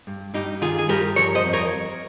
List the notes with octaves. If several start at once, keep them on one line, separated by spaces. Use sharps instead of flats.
G2
G2 D#4 G4
D#3 F4 G#4
G#4
G2 G4 A#4
F3 A#4 C#5
C5 D#5
F2
A#4 C#5